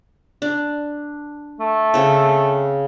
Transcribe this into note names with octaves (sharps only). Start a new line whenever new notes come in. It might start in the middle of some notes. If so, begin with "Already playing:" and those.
D4
A3
C#3 C4